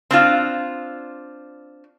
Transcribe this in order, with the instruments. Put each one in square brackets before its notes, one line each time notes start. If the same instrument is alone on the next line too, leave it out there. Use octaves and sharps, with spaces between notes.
[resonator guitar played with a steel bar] C4 D4 F4